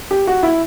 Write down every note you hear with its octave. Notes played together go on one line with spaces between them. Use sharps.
G4
F#4
E4